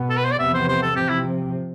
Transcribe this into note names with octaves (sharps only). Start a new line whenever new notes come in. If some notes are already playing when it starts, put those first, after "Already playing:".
Already playing: B2 B3
A4
B4
C5
D5
E2 C3 F3 B3 E5
C5
C5
A4
C3 F3 C4 G4
E4